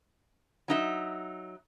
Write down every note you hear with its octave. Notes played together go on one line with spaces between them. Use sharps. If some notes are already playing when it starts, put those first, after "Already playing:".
F#3 D#4 E5